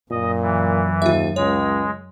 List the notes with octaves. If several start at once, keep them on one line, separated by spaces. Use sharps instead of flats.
F#2 A#2 D#5
E3
D#2 F4 E5
C#2 G#3 C#5